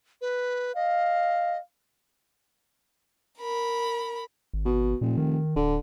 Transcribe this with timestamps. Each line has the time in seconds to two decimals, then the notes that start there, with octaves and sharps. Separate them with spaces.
0.21 B4
0.76 D#5 F5
3.39 A#4 B5
4.54 G#1
4.65 B2
5.01 F1 A#2
5.18 D#3
5.56 D1 D3